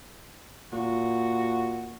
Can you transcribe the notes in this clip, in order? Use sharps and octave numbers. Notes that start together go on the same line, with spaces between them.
A#2 F#4